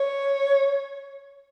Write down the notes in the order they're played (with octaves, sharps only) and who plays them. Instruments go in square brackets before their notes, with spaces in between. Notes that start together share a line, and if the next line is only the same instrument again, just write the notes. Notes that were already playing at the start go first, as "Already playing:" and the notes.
Already playing: [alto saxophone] C#5